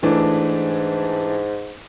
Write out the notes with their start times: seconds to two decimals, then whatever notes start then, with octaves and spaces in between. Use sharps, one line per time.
0.03 G#2 E3 A3 D4